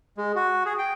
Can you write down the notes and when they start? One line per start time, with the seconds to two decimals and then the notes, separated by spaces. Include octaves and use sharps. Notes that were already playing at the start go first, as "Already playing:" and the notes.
0.17 G#3
0.36 F#4
0.66 G#4
0.78 G5